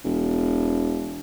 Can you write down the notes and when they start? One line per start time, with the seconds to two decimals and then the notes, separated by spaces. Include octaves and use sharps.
0.05 E1